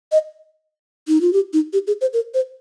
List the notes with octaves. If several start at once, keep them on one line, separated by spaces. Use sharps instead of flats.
D#5
D#4
F4
G4
D#4
G4
G#4
C5
A#4
C5